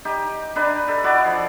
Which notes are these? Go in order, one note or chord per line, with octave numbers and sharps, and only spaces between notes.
D#4 G4
D4 D#4 B4
A4
E4 F#4 D5 D#5
F3